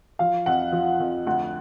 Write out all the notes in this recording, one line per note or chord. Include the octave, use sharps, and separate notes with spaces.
F3 F5
F2 F#5
F3
F2
D2 F#5